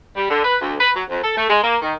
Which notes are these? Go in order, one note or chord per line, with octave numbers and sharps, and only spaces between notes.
G3
D3
B4
D2
B4
F#3
F2
A4
A3
G#3
A#3
D#3